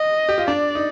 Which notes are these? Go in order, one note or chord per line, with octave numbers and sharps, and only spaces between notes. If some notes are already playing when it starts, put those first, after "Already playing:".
Already playing: D#5
G4
F4
D4 D5
D#4